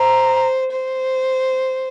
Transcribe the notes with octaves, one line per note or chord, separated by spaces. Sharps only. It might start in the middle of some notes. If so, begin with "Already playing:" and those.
Already playing: C5 A#5
C5